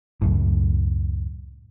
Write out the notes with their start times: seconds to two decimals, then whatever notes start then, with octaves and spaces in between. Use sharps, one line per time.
0.22 C#2 F#2 A2